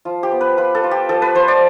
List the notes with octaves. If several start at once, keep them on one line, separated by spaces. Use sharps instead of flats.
F3 F4
G4
B3
B4
F4 B4
A4
F4
G4
F3 A4
B4
F3 C5
D5